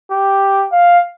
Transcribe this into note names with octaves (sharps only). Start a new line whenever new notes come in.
G4
F5